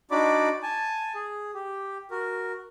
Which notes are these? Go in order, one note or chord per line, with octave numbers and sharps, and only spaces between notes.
D4 D#4 F#4 D5 B5 D6
G#5 A5
G#4
G4
F#4 A#4